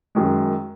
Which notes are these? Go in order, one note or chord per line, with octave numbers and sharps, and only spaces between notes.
F#2 D#3 G#3